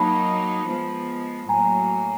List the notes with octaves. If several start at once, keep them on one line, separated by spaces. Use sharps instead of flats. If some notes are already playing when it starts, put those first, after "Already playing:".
Already playing: F#3 A#3 D#4 A5 B5
F3 G#3 B3
A2 F#3 A#3 G#5 A#5